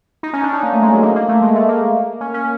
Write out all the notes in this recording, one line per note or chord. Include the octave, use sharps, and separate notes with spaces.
D#4
C#4
D4
D#4
A#3
A3
G#3
F#3
A#3
A#3
A3
G#3
A3
A#3
C#4
C#4